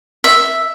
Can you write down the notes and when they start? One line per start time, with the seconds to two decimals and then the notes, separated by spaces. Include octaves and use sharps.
0.24 E5